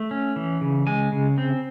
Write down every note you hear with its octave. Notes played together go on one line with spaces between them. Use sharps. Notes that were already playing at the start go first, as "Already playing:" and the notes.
Already playing: A3
C#4
E3
C#3
G#3 G#5
C#3
C4